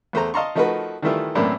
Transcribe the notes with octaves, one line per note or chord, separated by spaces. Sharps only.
E2 A3 C5 A#5
D#5 F5 A5 A#5 C6 C#6
F3 A3 D#4 F#4 A#4 B4
D#3 E3 G3 A3 E4 F4
F#2 A2 E3 A#3 C4 D4